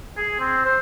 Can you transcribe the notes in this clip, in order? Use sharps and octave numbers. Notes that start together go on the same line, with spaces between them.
G#4
C4
C5